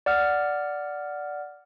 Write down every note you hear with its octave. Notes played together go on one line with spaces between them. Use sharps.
D5 F#5 F6